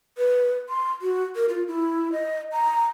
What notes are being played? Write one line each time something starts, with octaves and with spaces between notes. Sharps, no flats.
B4
C6
F#4
A#4
F4
E4
D#5
A#5